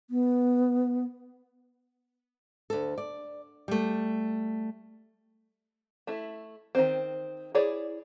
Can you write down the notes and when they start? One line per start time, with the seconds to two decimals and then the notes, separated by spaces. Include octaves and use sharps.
0.10 B3
2.70 D2 A4
2.98 D5
3.68 G3 A3
6.07 A3 E4
6.75 D#3 C4
7.55 E4 G#4 C#5 D5